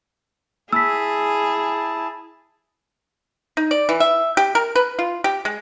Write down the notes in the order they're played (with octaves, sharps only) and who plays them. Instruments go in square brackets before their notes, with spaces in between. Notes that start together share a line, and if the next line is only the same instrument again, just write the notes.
[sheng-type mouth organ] E4 A5 [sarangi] G#4 [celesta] E6 B6
[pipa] D#4
D5
E3
E5
G4
A#4
B4
F4
G4
G#3